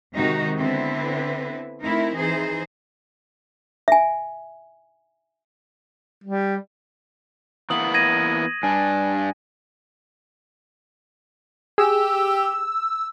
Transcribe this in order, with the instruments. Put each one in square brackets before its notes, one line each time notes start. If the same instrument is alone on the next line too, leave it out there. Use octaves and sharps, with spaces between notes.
[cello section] C3 D#3 G#3 D#4 F#4
D3 B3 C4 E4 B4
A3 C4 D#4 E4 A#4
E3 D#4 G#4 C5
[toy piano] E5 G#5
[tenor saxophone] G3
[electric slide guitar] E3 A#3 B3 [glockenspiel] D#6 F#7
[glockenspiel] G#6 A#6 D#7
[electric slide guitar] G2 D4 [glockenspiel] G#5
[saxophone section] G4 [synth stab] G#4 [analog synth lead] E6